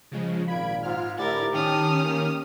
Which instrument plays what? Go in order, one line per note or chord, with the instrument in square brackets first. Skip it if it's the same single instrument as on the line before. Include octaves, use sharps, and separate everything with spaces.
[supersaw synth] C#3 F3 G#3
[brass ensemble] G#1 A#2 F5 [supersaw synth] B5 G#6 D7
[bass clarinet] G#2 [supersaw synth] F4 F6
[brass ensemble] A2 D3 [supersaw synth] E4 D5 [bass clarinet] G4 [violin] A#4 A6
[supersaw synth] D#3 C#4 [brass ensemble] D#4 G5 A5 [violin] D#6 F6
[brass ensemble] A#3